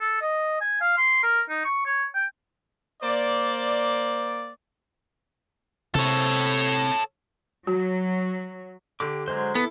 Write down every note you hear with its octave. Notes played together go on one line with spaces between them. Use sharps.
A4
D#5
G#5
F5
C6
A#4
D#4
C#6
C#5
G5
A#3 C5 D5
C3 A4 C#5
F#3 F#4
D3 G4 D6
F#3 G#3 C5
B3 E4 A4